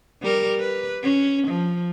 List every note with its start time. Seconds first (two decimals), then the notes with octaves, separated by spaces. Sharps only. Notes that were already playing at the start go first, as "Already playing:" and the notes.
0.22 G3 A#4
0.60 B4
1.03 C#4
1.48 F3